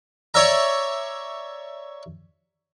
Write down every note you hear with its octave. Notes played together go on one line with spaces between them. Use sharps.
C#5 D5 E5 A#5